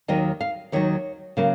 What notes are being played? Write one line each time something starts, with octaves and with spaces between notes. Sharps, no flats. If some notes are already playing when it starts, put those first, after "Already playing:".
D#2 D#3 F#3 D#5
F5
D#2 D#3 F#3 C#5
C#3 F#3 A#3